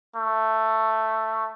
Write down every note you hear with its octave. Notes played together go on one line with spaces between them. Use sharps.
A3